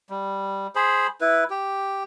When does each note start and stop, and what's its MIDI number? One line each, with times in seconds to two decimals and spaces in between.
0.10 0.67 55
0.75 1.07 68
0.75 1.07 72
0.75 1.07 83
1.21 1.44 64
1.21 1.44 71
1.50 2.03 67